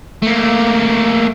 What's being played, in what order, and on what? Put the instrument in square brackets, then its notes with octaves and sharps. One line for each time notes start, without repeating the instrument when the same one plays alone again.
[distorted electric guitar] A3 A#3